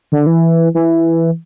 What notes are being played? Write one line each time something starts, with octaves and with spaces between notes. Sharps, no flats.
D3
E3
E3